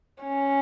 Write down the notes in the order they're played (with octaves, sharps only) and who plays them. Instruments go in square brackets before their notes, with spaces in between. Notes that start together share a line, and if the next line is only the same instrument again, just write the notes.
[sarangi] C#4